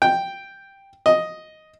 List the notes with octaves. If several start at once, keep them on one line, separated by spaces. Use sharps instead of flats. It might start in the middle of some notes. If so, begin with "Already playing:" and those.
G5
D#5